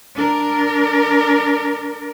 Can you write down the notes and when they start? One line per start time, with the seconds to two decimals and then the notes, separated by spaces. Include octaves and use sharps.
0.15 D4 A#4